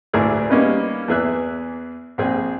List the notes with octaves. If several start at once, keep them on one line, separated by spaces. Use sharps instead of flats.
A1 D2 E4 G#4 A#4 D5
G3 A#3 B3 C#4 D#4 B4
E2 E3 G#4 E5 F#6
A#1 C4 G#4